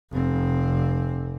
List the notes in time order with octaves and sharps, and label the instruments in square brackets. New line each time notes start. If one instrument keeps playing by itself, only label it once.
[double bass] F1 C4